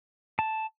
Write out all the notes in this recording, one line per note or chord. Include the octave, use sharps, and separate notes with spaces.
A5